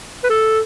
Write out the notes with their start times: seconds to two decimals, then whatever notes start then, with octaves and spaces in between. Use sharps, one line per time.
0.23 B4
0.30 A4